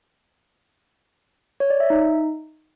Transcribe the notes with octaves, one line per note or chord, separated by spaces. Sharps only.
C#5
D5
E5
D#4